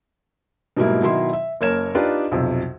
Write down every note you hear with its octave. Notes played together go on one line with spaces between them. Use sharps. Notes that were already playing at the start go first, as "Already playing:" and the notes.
G#2 B2 F#3 G3 A#3 E4
B2 D#3 F#3 E4 E5 C6
E5
F#1 A#3 A#4 C#5 G#6 E7
D4 D#4 F4 G4 B4 D5
B1 F2 C3